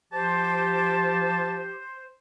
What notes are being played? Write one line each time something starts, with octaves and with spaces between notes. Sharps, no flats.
F3 G4 C5 A5